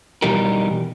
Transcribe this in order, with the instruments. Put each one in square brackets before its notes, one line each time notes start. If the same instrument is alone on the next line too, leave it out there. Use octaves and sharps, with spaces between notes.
[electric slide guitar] B2 E3 G3 D#4 G4 A#4